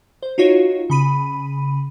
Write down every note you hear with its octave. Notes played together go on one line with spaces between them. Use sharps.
C5
D#4 F4 F#4 C#5
C#3 B5 D#7